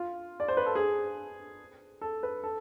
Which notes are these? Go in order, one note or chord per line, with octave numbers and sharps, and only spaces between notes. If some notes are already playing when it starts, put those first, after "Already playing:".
Already playing: F4
D5
C5
B4
A4
G#4
A4
B4
A4